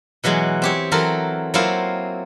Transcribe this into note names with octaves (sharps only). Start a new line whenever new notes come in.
B2 E3 F#3 G#3
C4 G4 C#5
E3 F#3 A4 A#4 C5
F#3 A#3 C4 E4 F4 C5